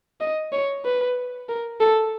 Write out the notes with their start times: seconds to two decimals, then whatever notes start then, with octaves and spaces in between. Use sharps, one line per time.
0.21 D#5
0.53 C#5
0.85 B4
1.49 A#4
1.80 A4